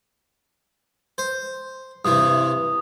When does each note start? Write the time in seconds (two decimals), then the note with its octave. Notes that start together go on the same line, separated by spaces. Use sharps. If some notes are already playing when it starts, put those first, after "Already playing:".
1.18 C5
2.05 G2 C3 E3 D#6